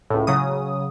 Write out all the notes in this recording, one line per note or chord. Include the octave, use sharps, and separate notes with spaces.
C#2 A2
C#3 F#3 D#6